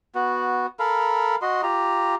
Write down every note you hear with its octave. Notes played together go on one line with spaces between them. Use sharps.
B3 F#4
A4 A#4 F5 B5
F#4 D#5 C6
F4 G4 A#5